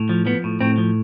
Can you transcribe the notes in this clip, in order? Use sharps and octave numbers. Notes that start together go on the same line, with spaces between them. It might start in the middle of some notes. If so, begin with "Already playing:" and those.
Already playing: A2
F3
F3 B3
A2
A2 C4
F3